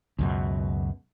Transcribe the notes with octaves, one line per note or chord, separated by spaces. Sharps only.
C#2 F#2 B2